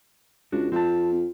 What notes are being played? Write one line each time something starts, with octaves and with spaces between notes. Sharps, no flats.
C#2 D4 F#4
F2 C4 A5